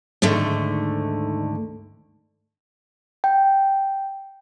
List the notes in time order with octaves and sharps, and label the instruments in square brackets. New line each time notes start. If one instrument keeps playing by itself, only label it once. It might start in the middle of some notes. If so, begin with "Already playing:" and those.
[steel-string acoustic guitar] D2 G#2 D3 D#3 A3
[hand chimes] G5